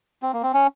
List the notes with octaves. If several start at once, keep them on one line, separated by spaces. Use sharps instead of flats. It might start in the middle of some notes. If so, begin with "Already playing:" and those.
C4
A#3
C4
C#4